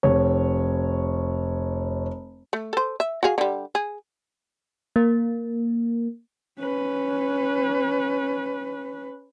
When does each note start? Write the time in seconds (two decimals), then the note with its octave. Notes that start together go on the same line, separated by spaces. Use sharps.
0.03 F1 C#5
2.53 A3
2.73 A4 C5
3.00 E5
3.23 F#4 G#4 F5
3.38 D3 G3
3.75 G#4
4.96 A#3
6.59 C#4 B4